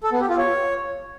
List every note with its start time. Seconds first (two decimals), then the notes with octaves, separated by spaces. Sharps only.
0.03 A4
0.12 B3
0.21 G4
0.29 F4
0.38 C#5